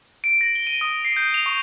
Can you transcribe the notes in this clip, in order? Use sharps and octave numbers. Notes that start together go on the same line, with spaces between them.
D7
A#6
G7
D#7
D#6
C7
G6
F7
C#6